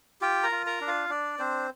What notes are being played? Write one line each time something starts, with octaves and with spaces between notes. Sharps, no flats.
F4 G4 G5
A#4 A#5
F4
A#4 A#5
D4
F4 F5
D4 D5
C4 D4 C5